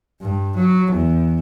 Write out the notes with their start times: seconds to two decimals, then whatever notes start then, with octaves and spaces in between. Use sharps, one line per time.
0.21 G2
0.56 F#3
0.92 E2